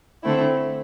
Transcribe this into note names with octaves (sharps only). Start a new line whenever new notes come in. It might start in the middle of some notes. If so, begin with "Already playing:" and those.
D3 A3 C4 E4